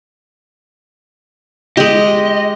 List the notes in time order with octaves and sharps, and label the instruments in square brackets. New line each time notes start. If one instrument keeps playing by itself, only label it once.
[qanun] G#3 G4 [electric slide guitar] D#5